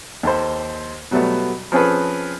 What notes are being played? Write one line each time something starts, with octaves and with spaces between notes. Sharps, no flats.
D#2 A4 C5
B2 F#3 G3 A3 B3
F3 C4 C#4 G#4 A4 B4